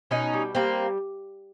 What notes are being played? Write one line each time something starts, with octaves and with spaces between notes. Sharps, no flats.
B2 C#4 D#4
G3
G3 A#3 C4